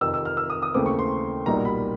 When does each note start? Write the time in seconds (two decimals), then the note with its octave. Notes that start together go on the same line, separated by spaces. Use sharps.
0.01 F2 C3 D#3 E6
0.14 E6
0.25 F6
0.37 E6
0.50 D#6
0.62 D#6
0.74 D#2 C#3 E3 A3 C4 D6
0.86 C#6
0.99 C6
1.46 B1 A#2 G3 A#3 D#4 A#5
1.65 B5